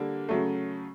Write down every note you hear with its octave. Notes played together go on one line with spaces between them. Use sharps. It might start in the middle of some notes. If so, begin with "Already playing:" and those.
Already playing: D3 G3 A#3
C#3 F#3 A3